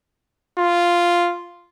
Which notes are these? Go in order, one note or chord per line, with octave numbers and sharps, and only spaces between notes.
F4